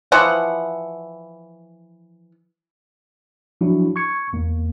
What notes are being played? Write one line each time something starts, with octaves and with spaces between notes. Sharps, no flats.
E3 F3 F#5
F3 F#3 D4 E4 F#4
C#6 G#6 C#7
E2 A#3